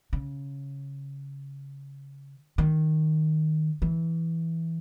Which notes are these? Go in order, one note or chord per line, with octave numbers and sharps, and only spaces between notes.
C#3
D#3
E3